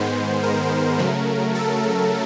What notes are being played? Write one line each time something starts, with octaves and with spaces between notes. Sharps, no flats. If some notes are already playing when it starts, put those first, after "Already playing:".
Already playing: G#2 D#3 G#3 B3 C5
A#4
C#3 F#3 A3
A4